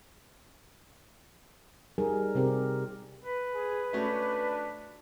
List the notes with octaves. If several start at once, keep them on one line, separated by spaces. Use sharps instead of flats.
G3 D#4 G#4 A#4
C3 C4 G4 A#4
B4
G#4
A3 C#4 D4 F#4